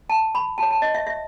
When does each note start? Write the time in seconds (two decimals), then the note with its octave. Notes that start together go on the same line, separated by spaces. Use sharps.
0.10 A5
0.35 B5
0.58 F#4 C#5 A5
0.71 A5
0.82 D#5
0.95 E5
1.07 E5